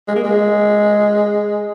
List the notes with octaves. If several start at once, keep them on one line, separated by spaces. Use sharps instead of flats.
G#3
A#3
G#3